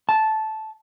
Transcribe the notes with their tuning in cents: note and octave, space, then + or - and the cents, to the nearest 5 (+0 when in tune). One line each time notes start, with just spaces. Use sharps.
A5 -10